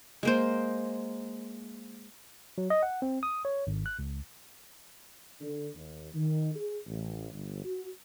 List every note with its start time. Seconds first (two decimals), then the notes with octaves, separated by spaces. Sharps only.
0.23 G#3 A#3 C5
2.58 F#3
2.70 D#5
2.83 F#5
3.02 C4
3.23 D#6
3.45 C#5
3.67 G#1
3.86 F#6
3.99 C#2
5.41 D3
5.75 D#2
6.15 D#3
6.55 G#4
6.87 A1
7.31 G1
7.64 F#4